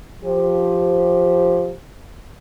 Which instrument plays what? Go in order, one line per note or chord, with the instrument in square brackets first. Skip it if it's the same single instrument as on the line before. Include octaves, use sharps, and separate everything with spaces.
[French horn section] F3 G4 C5